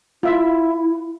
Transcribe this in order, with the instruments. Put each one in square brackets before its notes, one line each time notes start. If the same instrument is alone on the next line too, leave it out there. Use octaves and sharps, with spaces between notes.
[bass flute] E4 [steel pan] F4 E5